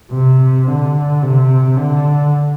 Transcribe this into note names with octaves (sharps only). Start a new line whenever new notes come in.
C3
D3
C3
D3